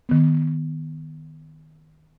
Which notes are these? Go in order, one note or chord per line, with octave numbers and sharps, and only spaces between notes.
D#3 B3